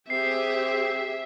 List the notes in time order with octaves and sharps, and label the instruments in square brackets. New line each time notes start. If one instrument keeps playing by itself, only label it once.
[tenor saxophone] C4 [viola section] G4 G#4 [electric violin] E5 [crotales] C7